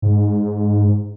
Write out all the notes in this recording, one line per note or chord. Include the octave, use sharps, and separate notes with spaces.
G#2